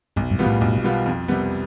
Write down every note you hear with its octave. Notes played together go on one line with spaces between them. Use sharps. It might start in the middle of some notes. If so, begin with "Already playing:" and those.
B1 G2
G2
B2 G3 B3 F4
A2
B1
B2 G3 B3 F4
F2
C3 G3 B3